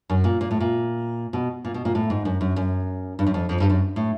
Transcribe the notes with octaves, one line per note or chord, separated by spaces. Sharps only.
F#2
A#2
A#2
A2
A#2
B2
A#2
B2
A#2
A2
G#2
F#2
F#2
F#2
G2
F#2
F2
F2
G2
F#2
A2